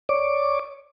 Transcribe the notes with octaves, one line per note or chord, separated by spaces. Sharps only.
C#5 D5 D6